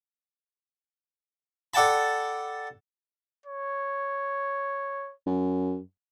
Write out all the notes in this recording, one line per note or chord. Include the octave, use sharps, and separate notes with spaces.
A4 D5 F#5 G5 A5 B5
C#5
F#2